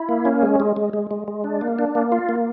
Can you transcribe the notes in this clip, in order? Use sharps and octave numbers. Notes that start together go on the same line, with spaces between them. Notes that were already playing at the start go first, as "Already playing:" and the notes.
Already playing: E4
A#3
C#4
G#3
G#3
G#3
G#3
G#3
G#3
D4
A#3
D4
A#3
F4
A#3